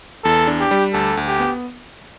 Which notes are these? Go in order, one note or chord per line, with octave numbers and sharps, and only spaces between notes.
E2 A4
D4
G4
G3
D2 A4
D2
G4
B3